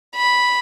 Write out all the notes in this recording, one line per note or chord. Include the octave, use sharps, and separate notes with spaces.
B5